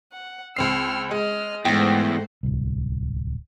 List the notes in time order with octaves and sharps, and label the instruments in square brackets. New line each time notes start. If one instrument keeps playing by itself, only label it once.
[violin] F#5
[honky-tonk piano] C#2 C4 C7 [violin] E6 F6
[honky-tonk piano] G#3 [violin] D#5 F6
[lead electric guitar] E2 [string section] G#2 A3 C5 [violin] F#5 A#6 [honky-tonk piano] G5
[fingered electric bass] D1 C2